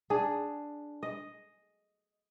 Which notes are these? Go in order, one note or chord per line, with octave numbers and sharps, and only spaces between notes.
D4 G#4
D#5